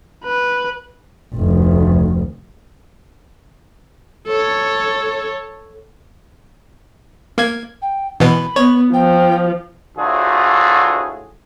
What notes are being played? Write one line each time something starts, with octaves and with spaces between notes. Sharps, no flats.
B4
F1 D2
A4 C#5
A#3 G#6
G5
B2 E3 B3 B5
B3 C#5
F3 G5
D2 A2 F4 F#4 G#4